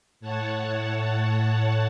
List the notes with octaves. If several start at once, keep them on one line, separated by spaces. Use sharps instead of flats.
A2 C#5 F#5 A5